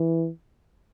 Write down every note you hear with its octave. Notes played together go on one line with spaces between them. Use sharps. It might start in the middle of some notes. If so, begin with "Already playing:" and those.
Already playing: E3